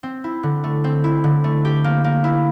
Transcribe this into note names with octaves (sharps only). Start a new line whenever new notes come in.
C4
E4
D3
A3
C4
E4
D3
A3
G4
A#3
A#3
E4